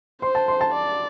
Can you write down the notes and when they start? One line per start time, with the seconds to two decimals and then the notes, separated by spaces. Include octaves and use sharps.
0.22 C5 C6
0.35 A5
0.48 C6
0.61 A5
0.74 D5